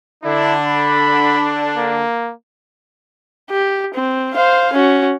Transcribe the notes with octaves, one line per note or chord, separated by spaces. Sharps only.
D3 D4 E4
B5
A#3
G4
C4
C5 F5
C#4 F#4